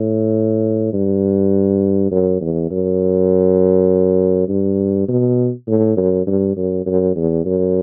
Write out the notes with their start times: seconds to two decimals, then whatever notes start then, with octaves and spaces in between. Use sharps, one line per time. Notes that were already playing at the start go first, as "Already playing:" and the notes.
Already playing: A2
0.93 G2
2.11 F#2
2.41 E2
2.71 F#2
4.48 G2
5.08 B2
5.68 A2
5.97 F#2
6.27 G2
6.56 F#2
6.86 F#2
7.16 E2
7.45 F#2